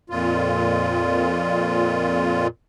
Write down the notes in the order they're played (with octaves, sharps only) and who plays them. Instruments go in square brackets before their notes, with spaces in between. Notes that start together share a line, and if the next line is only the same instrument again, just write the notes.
[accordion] F2 A#2 F4